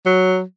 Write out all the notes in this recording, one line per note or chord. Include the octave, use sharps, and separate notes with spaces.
F#3